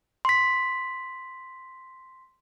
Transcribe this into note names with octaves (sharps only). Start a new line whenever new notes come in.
C6 B6